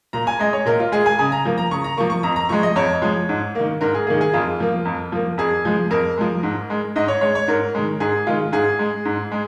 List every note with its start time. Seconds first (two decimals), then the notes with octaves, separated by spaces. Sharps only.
0.13 A#2 A#5
0.27 G#5
0.39 G#3 D#5
0.53 C#5
0.66 A#2 A#4
0.80 F4
0.92 G#3 G#4
1.06 G#5
1.19 C#3 G#5
1.32 A#5
1.45 F3 A#3
1.58 A#5
1.71 C#3 C#6
1.84 A#5
1.97 F3 A#3 C#6
2.10 C#6
2.23 F2 A#5
2.36 A#5
2.49 F3 G#3 C#6
2.63 D#5
2.76 F2 C#5
3.02 F3 G#3
3.29 G#2
3.55 D#3 A#3
3.81 G#2 A#4
3.94 G#4
4.07 D#3 A#3 G#4
4.21 G#4
4.33 F2 F4
4.60 F3 A#3
4.85 F2
5.12 F3 A#3
5.38 F2 G#4
5.65 F3 G#3
5.90 F2 A#4
6.18 F3 G#3
6.43 G#2
6.70 G#3
6.96 G#2 D#5
7.08 C#5
7.21 G#3 C#5
7.35 C#5
7.48 G#2 A#4
7.75 D#3 G#3
8.00 G#2 G#4
8.27 D#3 G#3 F4
8.52 G#2 G#4
8.79 G#3
9.05 G#2
9.32 G#3